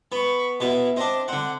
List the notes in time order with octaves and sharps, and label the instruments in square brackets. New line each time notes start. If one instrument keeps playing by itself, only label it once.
[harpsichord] B3 [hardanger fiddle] B5 C#6
[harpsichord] B2 B3 [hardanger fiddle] E4 E5
[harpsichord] C4 D4 [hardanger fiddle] C5 D#5
[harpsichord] D3 C4 [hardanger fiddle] F#5